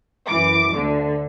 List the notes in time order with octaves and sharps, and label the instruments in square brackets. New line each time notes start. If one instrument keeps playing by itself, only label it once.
[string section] F#2 E3 D6
D2 D3